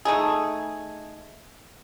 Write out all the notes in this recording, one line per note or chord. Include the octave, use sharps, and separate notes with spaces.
A3 D#4 G#4